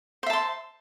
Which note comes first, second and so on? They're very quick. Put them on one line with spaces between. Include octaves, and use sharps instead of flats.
C5 E5 A5 C6